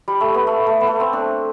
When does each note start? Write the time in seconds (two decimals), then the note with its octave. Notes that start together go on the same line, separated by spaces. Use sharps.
0.08 G3
0.21 A3
0.34 B3
0.47 A3
0.67 A3
0.81 B3
0.87 A3
1.00 C4
1.13 D4